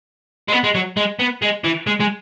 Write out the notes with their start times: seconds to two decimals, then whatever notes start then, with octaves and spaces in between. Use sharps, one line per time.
0.48 G#3
0.52 B3
0.64 G#3
0.75 F#3
0.97 G#3
1.19 B3
1.42 G#3
1.64 E3
1.87 G#3
2.00 G#3